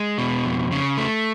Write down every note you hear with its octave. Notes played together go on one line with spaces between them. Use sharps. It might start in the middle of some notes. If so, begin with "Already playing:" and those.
Already playing: G#3
B2
F2
C#3
A3